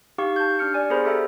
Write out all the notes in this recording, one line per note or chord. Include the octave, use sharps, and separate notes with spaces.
D#4 G4 F5 C#6
A5 G6
D4 G4 F6 C#7
D5 G#5
B3 G#4 A#4 C5 B5
G4 A4 E5 A#5